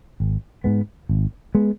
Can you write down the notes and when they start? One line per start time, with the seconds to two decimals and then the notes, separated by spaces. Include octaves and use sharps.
0.20 G#1
0.64 G#2 G#3 B3
1.09 G#1
1.55 G#3 B3